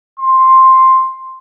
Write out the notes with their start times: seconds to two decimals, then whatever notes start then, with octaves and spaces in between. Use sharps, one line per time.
0.19 C6